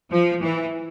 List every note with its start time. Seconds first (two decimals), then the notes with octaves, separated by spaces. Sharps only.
0.11 F3
0.42 E3